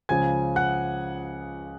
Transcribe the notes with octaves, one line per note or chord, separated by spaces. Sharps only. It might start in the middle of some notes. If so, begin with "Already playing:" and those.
C#2 C#3 F3 G#5 G#6
F#5 F#6